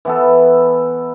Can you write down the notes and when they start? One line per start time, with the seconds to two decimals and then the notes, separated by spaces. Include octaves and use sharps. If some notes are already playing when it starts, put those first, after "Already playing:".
0.05 E3 B3 A4